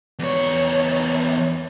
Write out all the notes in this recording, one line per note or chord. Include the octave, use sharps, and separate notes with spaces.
E2 C#5